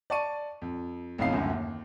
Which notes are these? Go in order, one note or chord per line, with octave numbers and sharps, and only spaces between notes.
D5 A5 C#6 D#7
F2
A1 F2 B2 D#4 F5 C7
C#2 F#2 A2 D3
D#2